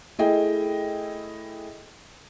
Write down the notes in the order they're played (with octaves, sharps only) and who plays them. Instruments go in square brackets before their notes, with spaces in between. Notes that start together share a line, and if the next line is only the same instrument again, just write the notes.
[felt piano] A3 E4 G#4 D#5 G5